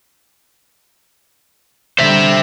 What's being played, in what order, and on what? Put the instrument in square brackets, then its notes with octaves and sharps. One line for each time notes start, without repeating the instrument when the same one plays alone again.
[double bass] D3 G3 [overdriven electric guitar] C5 E5